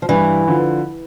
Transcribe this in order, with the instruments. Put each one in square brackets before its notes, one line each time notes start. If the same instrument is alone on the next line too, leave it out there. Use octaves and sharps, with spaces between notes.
[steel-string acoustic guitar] F3
[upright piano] G2 [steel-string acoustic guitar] E3
[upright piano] D3 F3